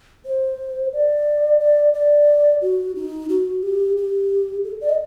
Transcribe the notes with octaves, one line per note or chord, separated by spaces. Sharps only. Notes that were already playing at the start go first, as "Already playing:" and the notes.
C5
D5
D5
D5
F#4
D#4
F#4
G4
G4
A4
D5
D#5